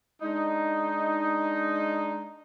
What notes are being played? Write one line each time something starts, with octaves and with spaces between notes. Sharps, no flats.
G#3 D4 D#4